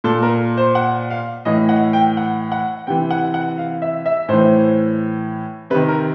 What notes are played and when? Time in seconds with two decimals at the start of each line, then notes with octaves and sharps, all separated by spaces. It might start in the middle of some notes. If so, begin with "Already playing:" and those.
0.04 A#2 A4
0.23 A#4
0.57 C5
0.75 F#5
1.10 F5
1.45 A2 E3 D#5
1.69 F#5
1.93 G5
2.17 F#5
2.52 F#5
2.87 C3 E3 G5
3.10 F#5
3.34 F#5
3.58 F5
3.82 E5
4.06 E5
4.28 A2 E3 C5
5.70 C3 B4
5.75 D#3
5.88 A#4